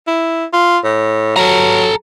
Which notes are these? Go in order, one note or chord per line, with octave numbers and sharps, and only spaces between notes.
E4
F4
A2
F#3 A4 A#5